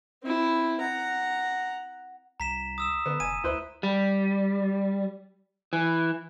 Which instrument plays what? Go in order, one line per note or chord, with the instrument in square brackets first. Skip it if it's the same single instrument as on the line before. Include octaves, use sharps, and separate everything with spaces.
[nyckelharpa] C4 E4
F#5 A#5
[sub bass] C2 [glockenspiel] A#5 B6 E7
[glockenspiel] D#6 E6 E7
[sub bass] D3 [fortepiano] B3
[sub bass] F1 [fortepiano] G#5 [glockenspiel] D#7
[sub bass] D2 [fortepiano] E4 B4 C5
[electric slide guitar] G3
E3